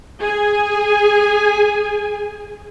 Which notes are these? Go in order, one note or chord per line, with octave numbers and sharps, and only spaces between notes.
G#4 G#5